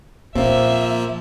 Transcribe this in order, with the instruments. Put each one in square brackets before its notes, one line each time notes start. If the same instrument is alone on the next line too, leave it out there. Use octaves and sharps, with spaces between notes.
[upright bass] A#2 [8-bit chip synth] F3 A#3 [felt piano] C4 [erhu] E5